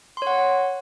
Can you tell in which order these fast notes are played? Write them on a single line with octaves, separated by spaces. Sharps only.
C6 C#5 F#5